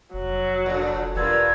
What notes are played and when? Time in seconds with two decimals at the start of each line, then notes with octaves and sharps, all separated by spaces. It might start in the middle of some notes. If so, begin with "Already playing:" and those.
0.14 F1 F#3
0.66 A#2 D3
1.15 E1 G2 G3 B3 F4 A#4 E6 G#6